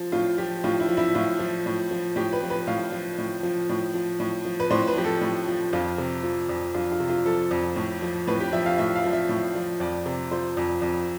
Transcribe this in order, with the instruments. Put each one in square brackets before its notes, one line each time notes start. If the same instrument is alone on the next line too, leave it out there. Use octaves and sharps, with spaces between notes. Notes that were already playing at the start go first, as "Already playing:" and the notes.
Already playing: [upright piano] F3 F4
A2 F4
F3 G4
A2 F4
E4
F3
E4
A2 F4
F3
A2
F3
A2 G4
B4
F3
B4
A2 F5
F3
A2
F3
A2
F3
A2
F3
B4
A2 C5
B4
F3 G4
A4
A2
F3
F2 F4
C3
F3
F2
F2 F4
F4
C3
F4
F3 A4
F2
A2
F3
A2 B4
G4
F3 E5
F5
A2 E5
F5
F3
E5
A2
F3
F2 D5
C3
F3 C5
F2
F2